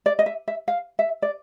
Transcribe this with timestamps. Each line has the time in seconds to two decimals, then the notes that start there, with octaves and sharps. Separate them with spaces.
0.06 D5
0.19 D#5
0.26 E5
0.48 E5
0.68 F5
0.99 E5
1.22 D5